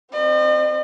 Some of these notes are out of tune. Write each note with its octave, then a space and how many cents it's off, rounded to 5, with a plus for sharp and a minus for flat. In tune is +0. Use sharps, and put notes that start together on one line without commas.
C4 +0 D#5 -45